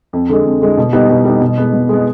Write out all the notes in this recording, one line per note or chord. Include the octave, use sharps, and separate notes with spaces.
F2
D3 G#3
F2
D3 G#3
B2
G3 B3 D#4
B2
G3 B3 D#4
B2
G#3 B3
B2
G#3 B3